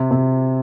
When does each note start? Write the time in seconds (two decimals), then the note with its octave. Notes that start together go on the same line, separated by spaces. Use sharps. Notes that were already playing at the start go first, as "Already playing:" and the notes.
Already playing: C3
0.11 C3